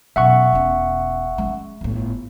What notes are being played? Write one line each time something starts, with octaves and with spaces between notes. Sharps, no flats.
F#2 B2 E5 F#5 C#6
E1 C#4
G#3 C#4
G1 A2